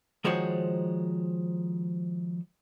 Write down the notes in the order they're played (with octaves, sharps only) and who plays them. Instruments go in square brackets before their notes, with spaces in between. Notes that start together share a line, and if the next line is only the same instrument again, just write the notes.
[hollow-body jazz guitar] D#3 F3 G#3 F#4 C5 C#5